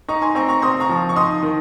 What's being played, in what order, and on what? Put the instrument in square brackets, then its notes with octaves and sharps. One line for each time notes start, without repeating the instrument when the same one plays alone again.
[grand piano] D#4 [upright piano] A#5 C#6
[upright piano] G#5 C6
[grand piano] C4 [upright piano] A#5 C#6
[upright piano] A#5 C#6
[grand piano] C4 [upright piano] C6 D#6
[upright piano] A#5 C#6
[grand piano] F3
[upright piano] C#6
[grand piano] D#4 [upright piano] C6 D#6
[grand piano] D#3